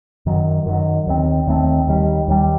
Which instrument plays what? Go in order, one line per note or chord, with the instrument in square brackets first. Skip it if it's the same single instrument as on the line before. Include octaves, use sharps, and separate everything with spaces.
[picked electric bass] F#2 D#3 F#3
F#2 D#3 F#3
D#2 D#3 A3 C4
D#2 D#3 A3 C4
D#2 D#3 G3
D#2 D#3 G3